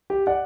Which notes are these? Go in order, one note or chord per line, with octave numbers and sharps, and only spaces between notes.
G4
D5 F#5